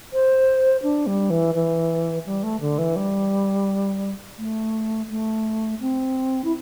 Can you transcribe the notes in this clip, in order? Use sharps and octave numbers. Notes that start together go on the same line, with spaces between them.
C5
D4
G3
E3
E3
G3
A3
D3
E3
G3
A3
A3
C4
E4